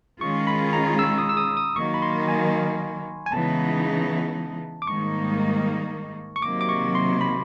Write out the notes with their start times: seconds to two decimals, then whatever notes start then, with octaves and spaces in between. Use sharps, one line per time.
0.21 D#3 G#3 C#4 F4 G#4 C#6
0.47 B5
0.73 A#5
0.99 E6
1.18 D#6
1.29 E6
1.37 D#6
1.57 D#6
1.76 D#3 F#3 A#3 C#6
1.94 B5
2.02 C6
2.28 G#5
3.26 G#5
3.32 C#3 E3 G#3 B3 D#4 A5
4.82 D6
4.87 G#2 D#3 G3 A#3 D#4 C#6
6.36 C#6
6.42 C3 D#3 F#3 A#3 D6
6.61 D6
6.69 C#6
6.95 C6
7.21 B5